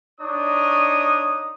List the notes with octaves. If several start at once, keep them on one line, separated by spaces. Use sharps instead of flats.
D4 D#4 C#5 D#6